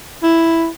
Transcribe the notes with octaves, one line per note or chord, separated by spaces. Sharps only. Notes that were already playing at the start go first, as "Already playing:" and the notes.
E4